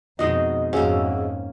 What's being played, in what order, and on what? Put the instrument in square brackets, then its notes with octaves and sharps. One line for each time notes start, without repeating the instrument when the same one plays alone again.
[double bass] F2 B2 [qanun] G#3 D#4 F#4 [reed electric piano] D#5 D#6
[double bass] F2 G#2 [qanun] A#3 C#4 [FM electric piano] F#4 G#4 E5